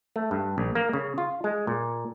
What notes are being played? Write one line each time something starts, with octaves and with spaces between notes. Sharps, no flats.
A3
G2
A#1
A#3
C#3
F4
G#3
A#2